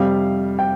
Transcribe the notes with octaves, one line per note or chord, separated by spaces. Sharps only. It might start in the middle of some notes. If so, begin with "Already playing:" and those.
Already playing: F2 C3 G3 F5
G5